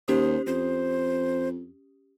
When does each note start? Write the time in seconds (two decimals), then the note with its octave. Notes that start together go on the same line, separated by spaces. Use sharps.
0.08 D#2 C#4 G4 C5 D#6
0.46 F2 C5